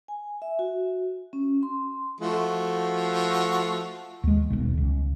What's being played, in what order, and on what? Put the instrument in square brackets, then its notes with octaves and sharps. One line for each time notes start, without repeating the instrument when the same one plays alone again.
[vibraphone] G#5
E5
F#4
C#4
C6
[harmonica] F3 A3 F#4
[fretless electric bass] D#2 G#3
D#1 B1
C#2